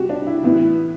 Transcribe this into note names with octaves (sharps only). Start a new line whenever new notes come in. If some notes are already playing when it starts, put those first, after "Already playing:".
Already playing: C3 G3 F#4 G4
D4
E4
A2 E3 B3 E4